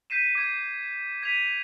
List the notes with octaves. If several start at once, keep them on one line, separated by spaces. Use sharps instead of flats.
G6 B6 C7 D#7 E7
D6 G#6 C7
G#6 B6 D#7 F7